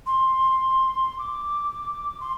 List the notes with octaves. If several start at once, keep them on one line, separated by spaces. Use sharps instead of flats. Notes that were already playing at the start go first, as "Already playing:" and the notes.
C6
D6
C6